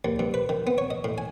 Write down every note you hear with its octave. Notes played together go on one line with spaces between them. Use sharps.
D#2
G2
B4
D#3
B3
C#5
D#5
A2
G#5